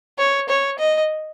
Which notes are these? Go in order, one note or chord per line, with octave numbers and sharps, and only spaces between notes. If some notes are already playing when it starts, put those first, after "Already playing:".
C#5
C#5
D#5